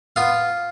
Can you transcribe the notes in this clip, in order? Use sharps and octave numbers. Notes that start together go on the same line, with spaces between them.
B3 F4 F5